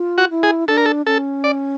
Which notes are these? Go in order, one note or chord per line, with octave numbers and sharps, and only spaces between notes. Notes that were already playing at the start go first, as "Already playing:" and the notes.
Already playing: F4
F#4
E4
G#4
D4 A4
A#4
A4
C#4 A4
D5